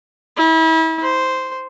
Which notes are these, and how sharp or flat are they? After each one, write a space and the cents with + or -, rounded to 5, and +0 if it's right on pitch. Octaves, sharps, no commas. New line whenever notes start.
E4 -35
C5 -5